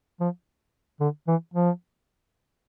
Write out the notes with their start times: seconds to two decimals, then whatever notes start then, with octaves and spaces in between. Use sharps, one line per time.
0.20 F3
1.00 D3
1.27 E3
1.54 F3